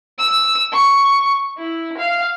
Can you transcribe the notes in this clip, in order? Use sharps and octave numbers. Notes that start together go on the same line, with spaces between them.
E6
C#6
E4
F5